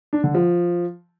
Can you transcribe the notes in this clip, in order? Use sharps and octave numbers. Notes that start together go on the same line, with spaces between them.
D4
D3
F3